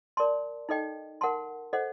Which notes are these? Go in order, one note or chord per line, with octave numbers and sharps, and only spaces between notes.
A#4 D5 A5 C6
D#4 A4 D#5 G5
A#4 F#5 A5 C6
A4 C5 D#5 F#5